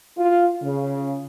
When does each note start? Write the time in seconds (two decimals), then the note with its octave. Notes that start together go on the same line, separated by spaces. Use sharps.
0.17 F4
0.63 C#3